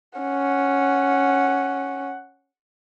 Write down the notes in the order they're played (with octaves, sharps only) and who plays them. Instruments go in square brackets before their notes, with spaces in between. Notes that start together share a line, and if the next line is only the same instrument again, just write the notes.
[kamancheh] C#4 F#5